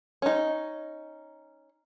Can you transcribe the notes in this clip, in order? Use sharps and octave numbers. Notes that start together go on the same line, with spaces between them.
C#4 D#4